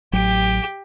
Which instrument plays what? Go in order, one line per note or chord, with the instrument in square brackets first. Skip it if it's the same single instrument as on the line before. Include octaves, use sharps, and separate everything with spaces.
[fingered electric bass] A1 F#3 [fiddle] G4